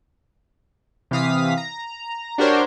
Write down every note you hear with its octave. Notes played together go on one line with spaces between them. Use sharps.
C3 E3 F5 D#6 B6
A#5
D4 F#4 G4 A#4 C5 C#5